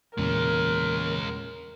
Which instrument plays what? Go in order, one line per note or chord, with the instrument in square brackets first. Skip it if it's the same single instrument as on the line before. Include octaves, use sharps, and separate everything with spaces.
[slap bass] E2 A#2 [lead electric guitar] G#3 C#4 [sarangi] A#4